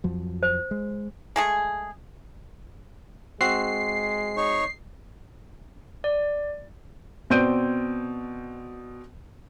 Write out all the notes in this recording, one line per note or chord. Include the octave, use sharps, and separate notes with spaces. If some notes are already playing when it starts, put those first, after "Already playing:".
F2 F3 F#3
C5
G#3
G#3 A3 G#4
G#3 C4 F#4 C7
D#4 C#5 C#6
D5
B2 C4 D5 G6 D7 D#7